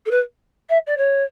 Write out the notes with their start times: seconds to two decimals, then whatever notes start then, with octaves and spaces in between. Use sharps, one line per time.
0.06 A4
0.11 B4
0.69 E5
0.87 D5
0.97 C#5